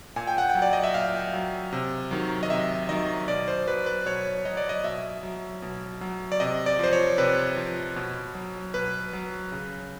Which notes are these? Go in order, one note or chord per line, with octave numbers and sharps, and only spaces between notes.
A#2 G#5
G5
F#5
G5
F#3
D5
D#5
E5
A#2 F5
F#3
C3
D#3 F#3
D#5
C3 E5
D#3 F#3 D#5
B2 D5
C5
F#3 B4
B4
B2 C#5
F#3 D#5
D5
D#5
B2 E5
F#3
B2
F#3
D5
C3 D#5
D5
F3 C5
C#5
C3 B4
F3
B2
F#3
B2 B4
F#3
C#3